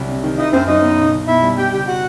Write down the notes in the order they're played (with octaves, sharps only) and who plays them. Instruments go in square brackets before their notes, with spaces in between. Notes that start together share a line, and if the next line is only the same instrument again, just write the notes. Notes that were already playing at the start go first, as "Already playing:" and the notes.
Already playing: [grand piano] C2 F#3 G3
C3
D#3
[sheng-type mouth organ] D#4 D#5 [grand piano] E4
[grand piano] F#2 [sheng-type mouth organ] C4 C5
[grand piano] F#3 [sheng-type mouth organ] D#4 D#5
[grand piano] B3
B1
B1
[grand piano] B2 [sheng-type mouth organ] E4 E5
[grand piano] G3
[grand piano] G3 [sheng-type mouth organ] G4 G5
[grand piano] F#1 [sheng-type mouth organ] G4 G5
[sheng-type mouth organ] F#4 F#5